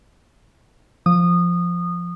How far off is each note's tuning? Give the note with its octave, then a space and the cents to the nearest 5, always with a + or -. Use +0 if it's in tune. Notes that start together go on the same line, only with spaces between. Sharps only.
F3 +0 D#6 -20